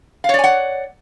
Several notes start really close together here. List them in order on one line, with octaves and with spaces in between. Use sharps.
F5 C#5 D5 G#5 F#5